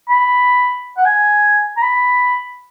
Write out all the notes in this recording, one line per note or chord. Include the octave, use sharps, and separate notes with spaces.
B5
F#5
G#5
A#5
B5